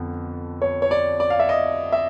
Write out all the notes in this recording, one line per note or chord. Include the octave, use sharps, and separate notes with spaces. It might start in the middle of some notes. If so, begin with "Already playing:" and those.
Already playing: F2 D3 B3
C#5
C#5
D5
D5
F5
E5
D#5
E5